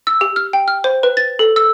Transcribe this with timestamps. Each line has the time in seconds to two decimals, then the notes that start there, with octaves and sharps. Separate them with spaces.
0.07 E6
0.21 G4
0.36 F6
0.53 G5
0.68 F6
0.84 C5
1.03 B4
1.17 A6
1.39 A4
1.56 E6